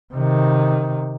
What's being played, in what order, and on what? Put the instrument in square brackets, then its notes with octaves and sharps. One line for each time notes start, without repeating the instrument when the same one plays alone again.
[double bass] C3 D#3